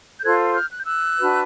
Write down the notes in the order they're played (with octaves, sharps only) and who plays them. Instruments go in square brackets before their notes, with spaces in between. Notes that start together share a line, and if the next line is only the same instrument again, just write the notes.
[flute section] G6
F4 A4 C5 F#6 G#6
F6 G6
F#6
G6
E6 F#6
D4 F#4 B4